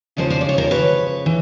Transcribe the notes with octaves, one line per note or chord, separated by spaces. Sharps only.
C#3 F3 G#3 C#4 A#4 C5
C5 D5
D5
C#5
A#4 C5
B4 C#5
E3